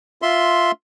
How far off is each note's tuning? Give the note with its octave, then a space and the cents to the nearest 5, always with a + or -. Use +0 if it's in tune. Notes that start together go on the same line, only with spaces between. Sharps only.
F4 +0 E5 +0 C6 +0